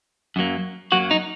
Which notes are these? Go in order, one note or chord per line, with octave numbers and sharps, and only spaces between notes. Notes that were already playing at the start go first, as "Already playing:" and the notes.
F#2 F#3 A#3
F#2 F#3 A#3 F#4
D#4